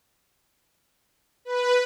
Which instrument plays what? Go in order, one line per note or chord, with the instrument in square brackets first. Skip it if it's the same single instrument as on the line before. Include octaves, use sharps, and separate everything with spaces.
[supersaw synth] B4